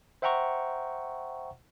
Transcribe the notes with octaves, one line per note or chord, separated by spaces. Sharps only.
C5 E5 F#5 G5 A#5 C#6